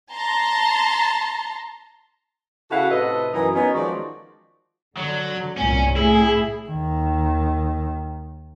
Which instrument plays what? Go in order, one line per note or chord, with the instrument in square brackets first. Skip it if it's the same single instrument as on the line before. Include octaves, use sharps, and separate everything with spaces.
[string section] A5 A#5 C6
[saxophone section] C#3 E4 F#4 A4 F5 F#5
A2 C3 A4 B4 D#5
F#2 E3 F#3 D#4 A#4 D#5
F#3 B3 C#4 D#4
D#3 F3 G#3 F#4 D5
[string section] D3 [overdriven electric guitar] F#3
[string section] C2 G2 A#2 [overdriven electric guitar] C#4
[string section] A2 G#4 [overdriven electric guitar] E4
[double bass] D#2 D#3